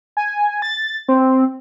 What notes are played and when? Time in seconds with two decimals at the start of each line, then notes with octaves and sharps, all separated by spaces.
0.17 G#5
0.62 A6
1.08 C4